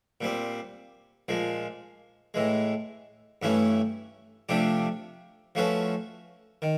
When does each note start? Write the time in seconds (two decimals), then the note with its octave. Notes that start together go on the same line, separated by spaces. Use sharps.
0.21 A#2 G3 C4
1.29 A#2 F3 G#3
2.34 A2 E3 G#3
3.42 G2 E3 A3 C#4 E4
4.49 C3 F3 A3 D4 G4
5.55 F3 A3 C#4 F#4 B4
6.62 D#3